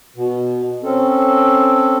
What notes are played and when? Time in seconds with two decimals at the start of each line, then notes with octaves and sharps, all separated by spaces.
0.16 B2
0.83 C4 C#4 A4